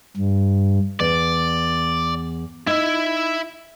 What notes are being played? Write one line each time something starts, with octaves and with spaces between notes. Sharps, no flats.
G2
E2 D5
D#4 E4 E5